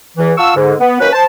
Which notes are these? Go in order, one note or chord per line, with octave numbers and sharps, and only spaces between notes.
E2 E3
F4 F5 F#5 A5 C#6 E6
G#2 D3
B3
D#3 F#3 A#3 C#4 D#4 B4
C5 A5